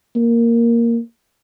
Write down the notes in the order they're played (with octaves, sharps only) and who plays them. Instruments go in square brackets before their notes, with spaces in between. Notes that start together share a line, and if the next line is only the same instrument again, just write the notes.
[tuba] A#3